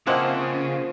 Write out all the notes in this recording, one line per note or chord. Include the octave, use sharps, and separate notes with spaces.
C#3 F3 A#3 C4 E4 C5 D#5 F#5